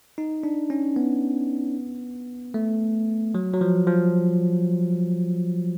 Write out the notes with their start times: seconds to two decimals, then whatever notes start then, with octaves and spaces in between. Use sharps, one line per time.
0.18 D#4
0.43 D4
0.70 C#4
0.96 B3
2.54 A3
3.35 F#3
3.53 F#3
3.61 F3
3.87 F3